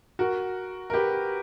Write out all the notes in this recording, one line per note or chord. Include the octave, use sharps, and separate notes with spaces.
F#4 A#4
A#4
G4 B4